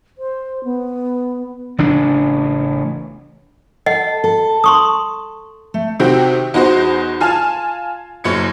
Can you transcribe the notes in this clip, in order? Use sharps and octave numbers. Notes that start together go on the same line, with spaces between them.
C5
B3
A1 C#3 D4
A4 D#5 F#5
A4
A5 C6 C#6 D#6
A3
C3 D#3 C4 F#4 G4
E2 D#4 F#4 C5
F4 G#5 A5 F6
F#1 F#2 G#6 C#7